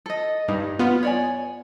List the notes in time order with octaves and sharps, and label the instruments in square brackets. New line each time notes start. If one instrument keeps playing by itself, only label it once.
[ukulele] A4 D#5
[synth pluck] G2 [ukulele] D#4
[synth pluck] B3 F4
[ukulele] C#5 D5 G#5